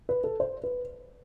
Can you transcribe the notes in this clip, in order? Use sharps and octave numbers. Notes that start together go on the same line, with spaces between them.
B4
A4
C5
B4